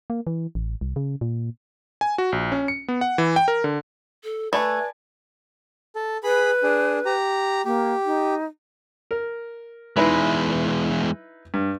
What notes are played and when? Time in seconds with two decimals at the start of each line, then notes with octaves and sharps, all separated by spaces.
0.10 A#3
0.27 E3
0.55 A1
0.81 C2
0.96 C#3
1.21 A#2
2.01 G#5
2.18 F#4
2.32 A#1
2.52 C#4
2.68 C#7
2.88 B3
3.01 F#5
3.18 E3
3.36 G5
3.48 A#4
3.64 D3
4.24 A4
4.53 A3 B4 D5 G#5 A5 B5
5.95 A4
6.23 G#4 B4 B5
6.63 D4 G#4
7.06 G4 A#5
7.65 A#3 G4
8.05 D#4
9.11 A#4
9.97 E2 G#3 D#4 E4 B4
11.54 G2